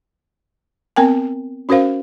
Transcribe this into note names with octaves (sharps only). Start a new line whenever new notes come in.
B3 C4 A#4 G5 G#5
C#4 F#4 A#4 C5 F5